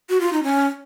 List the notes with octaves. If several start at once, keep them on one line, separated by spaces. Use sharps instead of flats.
F#4
F4
D#4
C#4